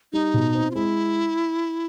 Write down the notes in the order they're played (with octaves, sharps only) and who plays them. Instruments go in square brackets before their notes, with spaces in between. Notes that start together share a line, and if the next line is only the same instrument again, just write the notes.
[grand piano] G3 [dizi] D#4
[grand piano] B2
C4
[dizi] F4
[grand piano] G#3 [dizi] E4